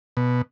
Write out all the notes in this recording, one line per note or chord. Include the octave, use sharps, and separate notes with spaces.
B2